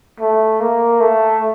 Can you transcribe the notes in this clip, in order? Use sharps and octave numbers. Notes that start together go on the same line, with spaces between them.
A3
A#3
A3